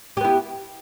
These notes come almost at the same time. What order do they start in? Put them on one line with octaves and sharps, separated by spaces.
G4 B3 E4